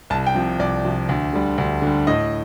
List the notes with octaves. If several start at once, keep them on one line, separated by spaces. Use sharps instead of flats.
C2 A5
G5
C3 F3
C2 D5
C3 F3
D2
D3 G3
D2
D3
G3
A2 D#5